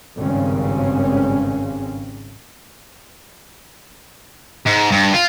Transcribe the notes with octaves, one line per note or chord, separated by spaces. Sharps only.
G#1 G2 C#3 C4 C#4
G#2
G2
F4